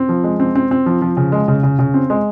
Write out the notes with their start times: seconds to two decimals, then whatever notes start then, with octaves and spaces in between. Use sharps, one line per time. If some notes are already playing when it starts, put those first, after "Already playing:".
Already playing: C4
0.09 F3
0.24 G#3
0.40 C4
0.55 C4
0.71 C4
0.86 F3
1.02 F3
1.17 C#3
1.32 G#3
1.48 C#3
1.63 C#3
1.79 C#3
1.94 C4
2.10 G#3